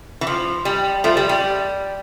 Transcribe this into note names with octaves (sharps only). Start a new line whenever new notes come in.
E3
F3
G3
F3 A3
G3
G3